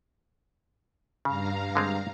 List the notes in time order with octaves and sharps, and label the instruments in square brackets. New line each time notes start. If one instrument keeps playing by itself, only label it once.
[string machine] G2 F5 A#5 [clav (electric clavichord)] C#3
[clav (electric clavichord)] D3 G#3 C4